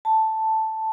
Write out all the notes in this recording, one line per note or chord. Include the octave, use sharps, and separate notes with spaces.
A5